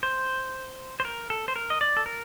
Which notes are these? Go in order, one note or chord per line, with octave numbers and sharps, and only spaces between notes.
C5
C5
A#4
A4
C5
A#4
D#5
D5
A4
A#4